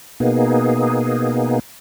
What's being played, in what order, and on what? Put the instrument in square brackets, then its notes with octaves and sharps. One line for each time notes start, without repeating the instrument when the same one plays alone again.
[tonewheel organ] B2 A#3 B3 D#4 G#4